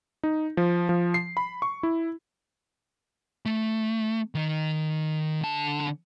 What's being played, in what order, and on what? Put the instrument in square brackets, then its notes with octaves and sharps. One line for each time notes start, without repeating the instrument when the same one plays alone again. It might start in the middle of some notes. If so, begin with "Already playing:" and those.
[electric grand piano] D#4
F3
F3
C7
B5
C#6
E4
[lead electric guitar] A3
D#3 D#5
D3 A5